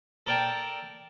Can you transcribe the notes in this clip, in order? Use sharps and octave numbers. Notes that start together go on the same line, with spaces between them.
A4 A#4 D5 G5 A5